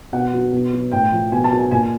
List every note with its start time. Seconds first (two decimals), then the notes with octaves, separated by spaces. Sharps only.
0.13 B2 F#5
0.33 F#3
0.52 B2
0.73 F#3
0.92 A2 G5
1.12 F3
1.31 B2 G#5
1.44 A5
1.52 F#3
1.58 G#5
1.71 A#2 G#5